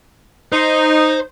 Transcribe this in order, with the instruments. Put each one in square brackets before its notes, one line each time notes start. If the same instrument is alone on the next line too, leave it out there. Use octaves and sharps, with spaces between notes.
[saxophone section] D#4 [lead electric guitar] C5